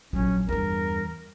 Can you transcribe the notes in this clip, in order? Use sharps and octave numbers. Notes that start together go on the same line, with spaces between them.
A#1 F#3 C#4
E2 G2 A#4